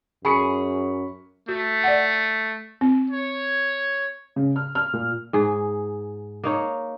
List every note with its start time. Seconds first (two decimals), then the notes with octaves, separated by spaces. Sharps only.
0.25 F#2 G#4 B5 C#6 C#7
1.48 A3 F#4
1.84 D5 F#5
2.81 C4
3.10 C#5
4.36 C#3
4.56 F6
4.75 F6
4.93 A#2
5.33 G#2 G#4
6.44 A#3 D#4 C#5